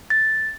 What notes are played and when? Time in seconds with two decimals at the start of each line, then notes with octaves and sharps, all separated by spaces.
0.10 A6